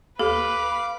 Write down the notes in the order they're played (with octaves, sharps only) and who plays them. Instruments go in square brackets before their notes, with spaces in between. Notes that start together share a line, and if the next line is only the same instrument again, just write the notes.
[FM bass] D#2 [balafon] A4 [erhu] B4 [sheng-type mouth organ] F5 D6